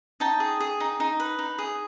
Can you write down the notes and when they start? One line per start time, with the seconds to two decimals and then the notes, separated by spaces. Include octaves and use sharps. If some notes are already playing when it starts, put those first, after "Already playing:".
0.20 D#4 G5 A5
0.40 G#4
0.60 G#4
0.80 D#4
1.00 D#4
1.20 B4
1.39 D#4
1.58 G#4